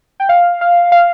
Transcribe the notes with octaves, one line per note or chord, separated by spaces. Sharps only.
G5
F5
F5
F5